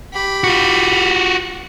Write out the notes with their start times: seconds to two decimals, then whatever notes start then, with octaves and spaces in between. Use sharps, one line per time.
0.13 G4 B5
0.44 F4 F#4